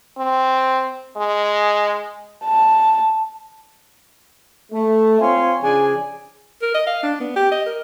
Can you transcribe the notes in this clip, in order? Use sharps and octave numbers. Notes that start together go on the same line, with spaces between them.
C4
G#3
A5
A3
C4 F4 C#5 F5 G#5 C6
C#3 F3 D4 G#4 G#5
A#4
D#5
F5
D4
B3
G4
D#5
A#4